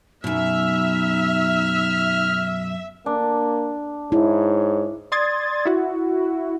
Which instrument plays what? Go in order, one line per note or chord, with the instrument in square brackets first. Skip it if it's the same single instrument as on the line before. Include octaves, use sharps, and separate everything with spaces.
[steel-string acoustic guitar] F#2 B2 [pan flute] D#4 [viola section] E5 [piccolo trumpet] F6
[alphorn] A#3 [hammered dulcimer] D4
[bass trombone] G#2 [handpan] E4 [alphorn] C#5
[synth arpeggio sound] D5 C6 D#6 G#6 A6
E4 F#4